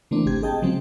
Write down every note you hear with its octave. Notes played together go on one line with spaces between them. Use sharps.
C#3 E3 A3 A#3 C4 D4
G#1 C4 G4 G#6
G#4 D#5 G5 A5
C#3 F3 F#3 G#3 C4